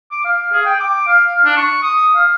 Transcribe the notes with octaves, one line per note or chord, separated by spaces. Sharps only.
D6
F5
G#4
G5
D6
F5
D4
C#6
D#6
F5